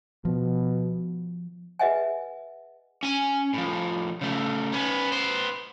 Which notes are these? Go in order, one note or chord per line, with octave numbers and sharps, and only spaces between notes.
B2 F3
G#4 B4 D#5 E5 F#5 G#5
C#4 G#5
A2 F3
C#3 A3
B3 C#4
B3 C5